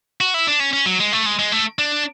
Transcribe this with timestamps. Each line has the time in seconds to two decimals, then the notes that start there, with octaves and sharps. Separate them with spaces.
0.21 F#4
0.34 E4
0.47 D4
0.60 C#4
0.73 C#4
0.86 F#3
1.00 G#3
1.13 A3
1.26 G#3
1.39 G#3
1.52 A3
1.79 D4